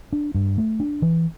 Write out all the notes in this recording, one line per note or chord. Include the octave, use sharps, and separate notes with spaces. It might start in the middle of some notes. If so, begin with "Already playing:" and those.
D4
G2
A3
D4
E3